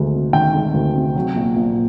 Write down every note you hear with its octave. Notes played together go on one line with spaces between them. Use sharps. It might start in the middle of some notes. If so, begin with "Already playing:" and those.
Already playing: D2 D#3 G#3
C3
D#3 G5
G#3
D2
C3
F#3
A#1
A#1